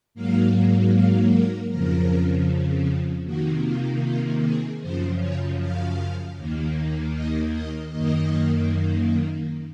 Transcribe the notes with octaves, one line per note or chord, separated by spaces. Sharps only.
G#2 F#3 A#3 F5
F5
A#4
F2 C#3 F3 A#4
C3 D#3 A#3 F#4
F4
F4
G#4
F#2 C#3 F3 C5
C#5
F5
D#2 D#3 A#3
D#5
D#5
F#2 D#3 A#3 D#5